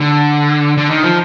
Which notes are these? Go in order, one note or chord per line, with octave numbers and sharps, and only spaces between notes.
D3
D3
D#3
F3